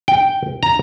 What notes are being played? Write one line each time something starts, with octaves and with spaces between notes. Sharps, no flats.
G5
A#5